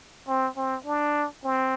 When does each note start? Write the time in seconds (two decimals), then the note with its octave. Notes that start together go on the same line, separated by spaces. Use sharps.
0.28 C4
0.57 C4
0.86 D4
1.44 C4